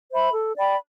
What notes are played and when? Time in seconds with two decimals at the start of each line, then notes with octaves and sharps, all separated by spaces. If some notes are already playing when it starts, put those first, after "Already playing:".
0.10 C5 E5 B5
0.33 A4
0.57 D5 G5 B5